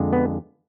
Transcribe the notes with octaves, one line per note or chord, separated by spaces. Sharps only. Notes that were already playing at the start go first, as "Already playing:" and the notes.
Already playing: F2 D3 G#3
B3